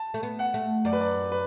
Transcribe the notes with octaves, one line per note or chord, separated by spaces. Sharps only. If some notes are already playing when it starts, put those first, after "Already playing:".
Already playing: A5
A3
B3
F#5
A3
F#2 D5
B4
D5
B4